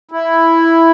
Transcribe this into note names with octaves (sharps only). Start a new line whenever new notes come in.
E4